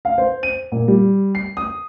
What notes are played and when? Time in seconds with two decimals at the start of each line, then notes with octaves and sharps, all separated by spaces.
0.05 F5
0.18 C5
0.43 D#7
0.72 A#2
0.88 G3
1.35 C7
1.57 D#6